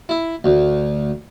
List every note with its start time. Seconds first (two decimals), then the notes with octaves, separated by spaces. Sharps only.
0.09 E4
0.44 D2